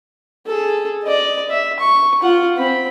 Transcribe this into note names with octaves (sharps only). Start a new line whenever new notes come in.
G#4 A4
D5 D#5
E5
C#6
F4 F#5
C4 B5